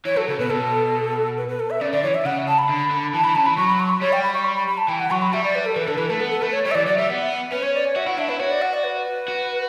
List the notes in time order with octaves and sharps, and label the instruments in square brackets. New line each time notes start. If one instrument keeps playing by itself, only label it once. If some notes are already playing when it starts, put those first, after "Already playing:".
[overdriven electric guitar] E3 [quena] C#5
[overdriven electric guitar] F#3 [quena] A4
[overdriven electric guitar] C#3 [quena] A4
[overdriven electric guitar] B2 [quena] B4
[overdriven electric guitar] B2 [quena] A4
[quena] B4
B4
A4
E5
[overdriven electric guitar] C#3 [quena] D5
[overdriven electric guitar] D3 [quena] D5
[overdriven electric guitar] E3 [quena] C#5
[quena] E5
[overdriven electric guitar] C#3 [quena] F#5
[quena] A5
B5
[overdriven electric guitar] D3
D3
[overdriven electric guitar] E3 [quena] A5
[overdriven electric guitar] E3 [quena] B5
[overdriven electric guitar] C#3 [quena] A5
[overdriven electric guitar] E3 [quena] B5
[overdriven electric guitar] F#3 [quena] C#6
[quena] B5
C#6
B5
[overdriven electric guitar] G3 [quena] C#5
[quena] G5
B5
C#6
B5
B5
B5
A5
[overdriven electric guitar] E3 [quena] G5
[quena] F#5
[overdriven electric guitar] F#3 [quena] C#6
[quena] B5
[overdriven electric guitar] G3 [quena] E5
[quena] D5
B4
A4
[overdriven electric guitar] E3 [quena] B4
[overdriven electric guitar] D3 [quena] A4
[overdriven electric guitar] E3 [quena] B4
[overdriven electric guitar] A3 [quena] A4
[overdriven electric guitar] B3 [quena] B4
[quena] A4
[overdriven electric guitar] A3 [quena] B4
[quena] C#5
[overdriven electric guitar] G3 [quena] C#5
[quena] E5
[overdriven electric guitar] E3 [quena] D5
[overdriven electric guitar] F#3 [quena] D5
[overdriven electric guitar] G3 [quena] E5
[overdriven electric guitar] B3
[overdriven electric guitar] C#4 [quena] B4
[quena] C#5
D5
C#5
[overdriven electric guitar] F#4 [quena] E5
[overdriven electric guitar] E4 [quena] F#5
[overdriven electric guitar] D4 [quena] E5
[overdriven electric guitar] E4 [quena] B4
[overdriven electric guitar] F#4 [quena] C#5
[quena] D5
F#5
D5
B4
[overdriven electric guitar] F#4